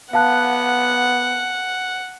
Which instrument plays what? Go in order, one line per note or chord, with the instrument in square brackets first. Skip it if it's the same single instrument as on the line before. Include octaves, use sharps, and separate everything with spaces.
[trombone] B3 [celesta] F5 A5 F#6 [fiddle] F#5